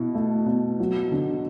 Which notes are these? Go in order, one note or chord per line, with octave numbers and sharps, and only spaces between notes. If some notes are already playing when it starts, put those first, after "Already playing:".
Already playing: B2 E4
A3
B2
F#3
D3